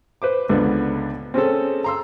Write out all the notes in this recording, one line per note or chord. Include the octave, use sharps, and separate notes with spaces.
B4 C5 D6
C#2 D3 B3
C4 C#4 G#4 A4
A#5 C6 E6